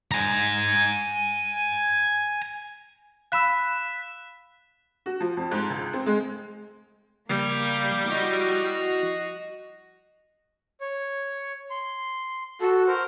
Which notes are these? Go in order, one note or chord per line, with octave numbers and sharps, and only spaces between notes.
G#5 A#5
F5 B5 E6 F#6 B6 E7
F#4
F3
F2
G#2
C#2
C4
G#3
C#3 F3 G3 A#3
F3 E4 F#4 D#5
C#5
C6
F#4 A4
A#4 C5